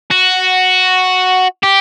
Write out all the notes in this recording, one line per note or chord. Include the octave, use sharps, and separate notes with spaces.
F#4
G4